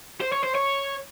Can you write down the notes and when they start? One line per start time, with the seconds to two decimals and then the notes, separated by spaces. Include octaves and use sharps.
0.21 C5
0.33 C#5
0.44 C5
0.55 C#5